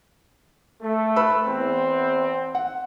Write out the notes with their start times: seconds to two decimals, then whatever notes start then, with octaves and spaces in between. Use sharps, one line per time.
0.82 A3
1.16 B4 B5 E6
1.45 E2 C4
2.55 F#5